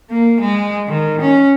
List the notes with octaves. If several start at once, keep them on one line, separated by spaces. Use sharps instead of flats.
A#3
G#3
D#3
C#4